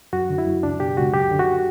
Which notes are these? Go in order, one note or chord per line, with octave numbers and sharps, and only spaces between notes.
F#2 F#4
D3
E4
F#2
C#2 D4
B2 G4
C#2 F#4
F#2 G4
D3
F#4